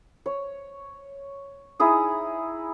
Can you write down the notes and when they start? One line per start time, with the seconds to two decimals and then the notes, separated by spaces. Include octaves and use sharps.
0.26 C#5
1.80 D#4 E4 G#4 D#6